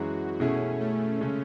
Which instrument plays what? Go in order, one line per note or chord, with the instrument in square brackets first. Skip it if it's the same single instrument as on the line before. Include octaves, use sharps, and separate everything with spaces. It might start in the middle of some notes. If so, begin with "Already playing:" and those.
Already playing: [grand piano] F#2 E3 G#3 [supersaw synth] F#4
[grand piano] B2 A3 E4 G#4 [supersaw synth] C#4
[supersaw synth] A3
[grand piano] C#3 G#3 C#4